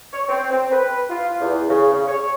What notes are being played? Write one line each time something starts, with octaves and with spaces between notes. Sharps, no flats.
C#5
C4
C4
B4
F4
E2
C#3
C#3
C#5